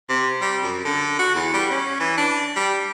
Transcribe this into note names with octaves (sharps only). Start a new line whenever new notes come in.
C3
G3
F#2
D3
F#4
E2
G3
C#4
E3
D4
G3